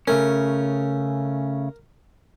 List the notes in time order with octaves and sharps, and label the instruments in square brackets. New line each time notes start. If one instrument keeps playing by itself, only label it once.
[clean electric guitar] C#3 A3 C#4 [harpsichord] A#4